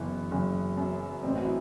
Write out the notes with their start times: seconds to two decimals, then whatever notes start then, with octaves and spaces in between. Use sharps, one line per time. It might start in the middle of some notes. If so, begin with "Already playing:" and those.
Already playing: F#1 E3 B3
0.31 F#1
0.77 F#2
1.23 A1 C4
1.35 F#4
1.45 E4